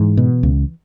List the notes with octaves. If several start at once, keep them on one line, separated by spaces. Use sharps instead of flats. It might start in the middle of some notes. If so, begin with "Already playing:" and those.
Already playing: G#2 E3
B2
C#2